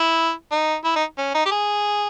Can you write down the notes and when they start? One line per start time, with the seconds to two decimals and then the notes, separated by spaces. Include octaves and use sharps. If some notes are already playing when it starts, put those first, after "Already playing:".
Already playing: E4
0.52 D#4
0.84 E4
0.96 D#4
1.18 C#4
1.34 D#4
1.46 G4
1.51 G#4